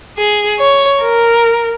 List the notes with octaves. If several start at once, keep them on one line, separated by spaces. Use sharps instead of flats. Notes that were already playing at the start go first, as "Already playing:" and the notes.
G#4
C#5
A#4